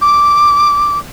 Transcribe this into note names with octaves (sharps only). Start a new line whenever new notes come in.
D6